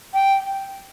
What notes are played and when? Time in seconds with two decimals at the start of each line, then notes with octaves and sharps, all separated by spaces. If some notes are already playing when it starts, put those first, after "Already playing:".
0.14 G5